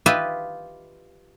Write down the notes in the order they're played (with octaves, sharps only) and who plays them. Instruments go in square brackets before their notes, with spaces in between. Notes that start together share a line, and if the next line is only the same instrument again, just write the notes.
[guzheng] F4 G4 B4 D#5 E5